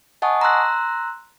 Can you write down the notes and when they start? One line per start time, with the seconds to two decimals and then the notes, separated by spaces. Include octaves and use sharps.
0.22 D#5 F#5 G#5 A5 C#6 D#6
0.41 A#5 C6 E6 F#6 A#6